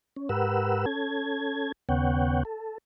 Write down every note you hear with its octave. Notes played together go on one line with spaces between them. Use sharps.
C#4
G#2 G4 A#4 B4 F#5 E6
C#4 A4 G#6
D#2 C#3 B3 C#5 F#5 G5
A4